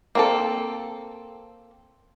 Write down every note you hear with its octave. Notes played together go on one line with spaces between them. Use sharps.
A#3 C4 A4